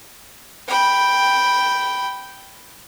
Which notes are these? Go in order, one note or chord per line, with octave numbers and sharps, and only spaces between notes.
G5 B5